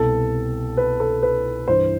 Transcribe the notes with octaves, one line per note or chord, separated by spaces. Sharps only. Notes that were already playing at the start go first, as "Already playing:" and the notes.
Already playing: C2 B2 A4
B4
A4
B4
G2 E3 C5